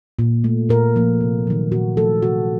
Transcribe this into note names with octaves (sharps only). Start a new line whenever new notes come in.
A#2
A3
A#2 A#4
F3 A#3
C3
D#3 F#3
A#2 F#4
F3 A3 A4
C3 F#4